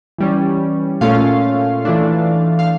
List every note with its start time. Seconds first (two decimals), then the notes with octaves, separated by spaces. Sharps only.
0.18 E3 G3 C#4
1.01 A#2 A3 C#4 F4 F5
1.85 E3 A3 D4
2.59 F5